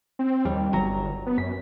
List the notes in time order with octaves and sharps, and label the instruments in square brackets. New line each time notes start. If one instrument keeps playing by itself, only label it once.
[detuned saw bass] C4
[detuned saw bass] D#2 [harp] G3
[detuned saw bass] G1 [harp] F#3 A#5
[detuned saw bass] B3
[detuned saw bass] F#2 [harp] B6